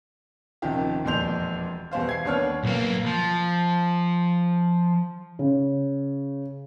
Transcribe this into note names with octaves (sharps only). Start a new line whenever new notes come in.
D#1 C3 D#3 F3 G4
E1 F2 A#2 C6 G6 F7
E2 B2 G3 C5 F5
G#6 C7
D#2 B3 D4 C#5 A5 F6
B1 A#3
F3
C#3